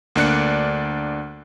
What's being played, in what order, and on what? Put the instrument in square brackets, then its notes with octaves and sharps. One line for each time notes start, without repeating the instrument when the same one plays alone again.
[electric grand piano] D2 A#3 D4 D5 F#6 C#7